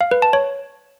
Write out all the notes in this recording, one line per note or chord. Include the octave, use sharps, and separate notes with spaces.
F5
B4
A5
C#5